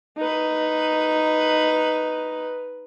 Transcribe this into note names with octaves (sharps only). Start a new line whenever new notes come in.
D#4 B4